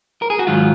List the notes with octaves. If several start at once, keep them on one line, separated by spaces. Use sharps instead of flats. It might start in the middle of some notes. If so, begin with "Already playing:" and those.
A#4
G#4
F#4
G#2 D#3 F#3 F4